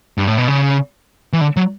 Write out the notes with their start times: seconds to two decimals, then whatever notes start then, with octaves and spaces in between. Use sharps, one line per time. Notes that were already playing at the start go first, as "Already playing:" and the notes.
0.18 G2
0.28 A2
0.38 B2
0.48 C#3
1.33 E3
1.41 D3
1.57 F#3